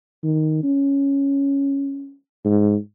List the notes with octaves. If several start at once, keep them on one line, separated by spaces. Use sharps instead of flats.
D#3
C#4
G#2